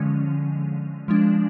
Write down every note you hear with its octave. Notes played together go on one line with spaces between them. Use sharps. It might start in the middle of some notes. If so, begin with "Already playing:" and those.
Already playing: D3 F3 G#3 C#4
F3 G#3 D4